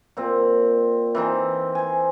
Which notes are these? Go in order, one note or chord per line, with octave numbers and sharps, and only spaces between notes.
A#2 C4
E3 C4 D#4
C5 G#5